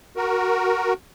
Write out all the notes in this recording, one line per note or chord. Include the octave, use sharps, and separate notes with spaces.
F#4 A#4